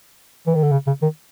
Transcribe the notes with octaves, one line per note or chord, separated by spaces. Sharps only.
E3
D#3
D3
C#3
C#3
D#3